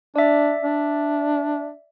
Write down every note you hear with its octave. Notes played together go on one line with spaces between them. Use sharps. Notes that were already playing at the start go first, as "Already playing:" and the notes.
D4 D5 E5
D4